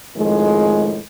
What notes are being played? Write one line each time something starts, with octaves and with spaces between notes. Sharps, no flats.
F2 A2 D#3 F3 G#3